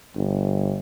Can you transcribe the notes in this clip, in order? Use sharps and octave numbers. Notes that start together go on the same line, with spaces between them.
G1